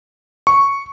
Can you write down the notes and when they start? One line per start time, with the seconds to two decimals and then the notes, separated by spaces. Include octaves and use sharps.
0.47 C#6